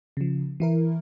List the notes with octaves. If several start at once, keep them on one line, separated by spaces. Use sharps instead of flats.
C#3 F3
E3 E4 A#4